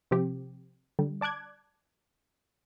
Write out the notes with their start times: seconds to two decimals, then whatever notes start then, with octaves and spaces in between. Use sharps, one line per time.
0.11 C3 F3 C4 G4
0.99 D3 G3
1.21 D5 A5 D6 F#6 G#6